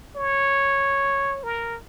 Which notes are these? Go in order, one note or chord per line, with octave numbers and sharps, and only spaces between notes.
C#5
A#4